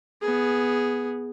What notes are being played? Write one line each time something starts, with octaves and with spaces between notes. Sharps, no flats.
B3 G#4